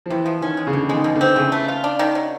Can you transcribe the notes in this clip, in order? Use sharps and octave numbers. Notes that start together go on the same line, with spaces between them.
F3
C3 E3
F3
D#3 C#4
G#3
C#3
B2 D3
D#3 G#3
B2
D3
C4
C#3 E3
A3
F4
D4
D#3
F#3